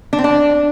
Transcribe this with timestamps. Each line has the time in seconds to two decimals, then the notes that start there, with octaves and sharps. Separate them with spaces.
0.13 D4
0.18 C4
0.24 D4